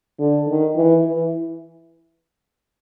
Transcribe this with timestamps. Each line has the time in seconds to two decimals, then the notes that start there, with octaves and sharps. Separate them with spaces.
0.19 D3
0.48 D#3
0.76 E3
1.05 E3